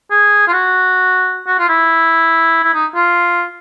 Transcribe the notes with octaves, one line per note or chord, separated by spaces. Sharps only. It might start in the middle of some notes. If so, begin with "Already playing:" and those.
G#4
F4
F#4
F#4
F4
E4
E4
D#4
F4